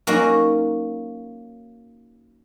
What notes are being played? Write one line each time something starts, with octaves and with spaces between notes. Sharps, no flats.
F#3 A#3 C#4 D#4 F#4